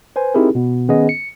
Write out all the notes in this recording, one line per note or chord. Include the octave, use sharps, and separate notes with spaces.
B4 C5 G#5
C4 D#4 E4 G4 G#4 A#4
B2 B3
D#3 B3 C#4 G#4 D#5
C#7